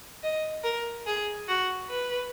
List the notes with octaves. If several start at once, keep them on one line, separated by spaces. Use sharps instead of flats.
D#5
A#4
G#4
F#4
B4